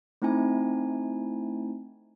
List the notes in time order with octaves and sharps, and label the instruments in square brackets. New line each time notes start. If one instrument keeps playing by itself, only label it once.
[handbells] A3 C4 D#4 E4 G#5